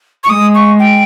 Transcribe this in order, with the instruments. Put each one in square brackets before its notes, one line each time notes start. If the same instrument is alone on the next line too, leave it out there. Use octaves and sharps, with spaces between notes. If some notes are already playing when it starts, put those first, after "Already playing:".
[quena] C#6
[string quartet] G#3 [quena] D#6
[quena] C#6
G5